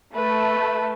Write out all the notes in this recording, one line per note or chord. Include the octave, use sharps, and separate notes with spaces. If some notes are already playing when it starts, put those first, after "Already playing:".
A3 B4